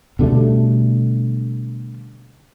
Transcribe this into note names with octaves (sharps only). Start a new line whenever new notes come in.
B2 D3 G3 A3